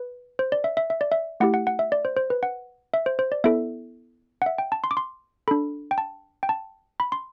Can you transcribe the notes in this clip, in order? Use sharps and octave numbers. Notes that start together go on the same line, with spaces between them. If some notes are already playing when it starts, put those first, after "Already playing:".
Already playing: B4
C5
D5
E5
E5
E5
D5
E5
A3 E4 G4 F#5
F#5
F#5
E5
D5
C5
C5
B4
F#5
E5
C5
C5
D5
B3 E4 A4 E5
F#5
E5
G5
A5
C6
D6
C6
D4 A4 B5
G5
A5
G5
A5
B5
C6